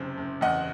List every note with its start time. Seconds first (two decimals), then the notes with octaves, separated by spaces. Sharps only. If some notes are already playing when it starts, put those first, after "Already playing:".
Already playing: F#1 C3 C5
0.17 F#1
0.41 E2 D#5 F#5